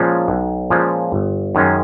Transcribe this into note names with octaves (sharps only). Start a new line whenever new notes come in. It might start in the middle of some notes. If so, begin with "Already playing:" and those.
Already playing: A#2 F3 G#3 C#4
B1
A#2 F3 G#3 C#4
G1
F#2 D#3 G#3 C#4